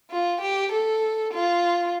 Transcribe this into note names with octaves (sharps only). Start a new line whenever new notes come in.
F4
G4
A4
F4